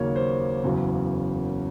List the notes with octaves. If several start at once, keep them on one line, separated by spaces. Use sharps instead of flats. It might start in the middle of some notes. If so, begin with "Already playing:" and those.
Already playing: D#2 C#3 F#3 A#3 C#4 C#5
C5
F#1 E2 C#3 F#3